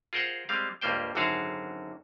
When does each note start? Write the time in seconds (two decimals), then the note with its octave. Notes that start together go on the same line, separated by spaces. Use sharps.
0.13 F4 G#4 A#4 C5 F#5
0.49 G3 G#3 C4 F5
0.81 C#2 G2 G3 A#3 C5 G5
1.15 G#1 F#2 D3 F#4 G#4 F5